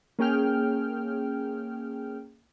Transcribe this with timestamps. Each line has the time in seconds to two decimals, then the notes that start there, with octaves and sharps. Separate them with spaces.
0.19 A#3 C#4 G#4 G5 F6